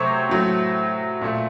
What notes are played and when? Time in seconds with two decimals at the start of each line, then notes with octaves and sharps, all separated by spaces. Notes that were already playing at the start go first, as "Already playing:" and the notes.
Already playing: C3 F#3 A3 C5 C#5
0.29 A2 F#3 A3
1.21 A#2 A3